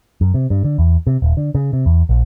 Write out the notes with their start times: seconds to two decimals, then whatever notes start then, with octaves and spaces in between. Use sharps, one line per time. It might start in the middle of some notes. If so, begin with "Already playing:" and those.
0.21 F#2
0.34 C3
0.50 G2
0.64 D3
0.78 E2
1.07 C3
1.22 D#1
1.37 D3
1.55 C#3
1.73 C3
1.86 E2
2.09 A#1